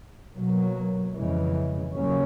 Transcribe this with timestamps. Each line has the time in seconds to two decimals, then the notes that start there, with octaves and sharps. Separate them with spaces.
0.36 B2 F#3 A#3
1.13 F2 C#3 E3 G#3
1.92 D#2 C#3 F#3 A#3 C#4